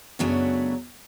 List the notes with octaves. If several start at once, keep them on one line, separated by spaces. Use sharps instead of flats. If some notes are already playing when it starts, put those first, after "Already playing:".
F#2 C#3 F#3 A3 B3 D4